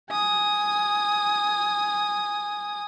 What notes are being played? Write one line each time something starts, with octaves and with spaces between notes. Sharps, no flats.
G#5 D#6